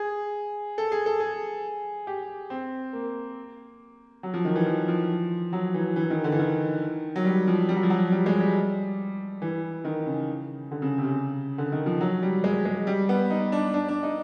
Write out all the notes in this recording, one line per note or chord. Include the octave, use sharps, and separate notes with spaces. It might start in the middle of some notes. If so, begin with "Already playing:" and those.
Already playing: G#4
A4
G#4
A4
G#4
G4
C4
A#3
F#3
F3
D#3
E3
F3
F3
F#3
E3
E3
D#3
D3
E3
D#3
F#3
G3
F3
G3
F#3
F3
F#3
G3
G#3
G3
E3
D#3
C#3
D3
C#3
C3
C#3
D3
D#3
F3
F#3
G3
G#3
G#3
G3
B3
D#4
D4
D4
D4
D#4